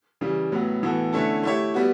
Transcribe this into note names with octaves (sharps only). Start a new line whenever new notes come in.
C#3 E3 G3
A2 F#3 B3
A2 E3 B3 F#4 A4
D3 A3 C#4 E4 A4
A3 E4 G4 C#5
G3 B3 F#4